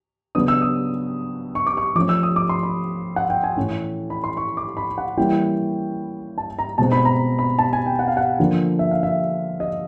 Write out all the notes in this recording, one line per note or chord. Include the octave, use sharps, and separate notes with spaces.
C#3 F#3 B3 D4 D#6
E6
D#6
C#6
D6
C#6
F3 A3 C#4 D6
E6
D#6
D6
C6
B5
F#5
G5
G#5
A2 E3 A3 C#4 E4
B5
C6
C#6
D6
B5
F#5
E3 G3 A#3 C#4 E4 G5
A5
A#5
B2 G#3 C4 A5
B5
A#5
B5
A5
G#5
G5
F#5
F5
F#5
D3 F3 A#3 D4
E5
F5
E5
D#5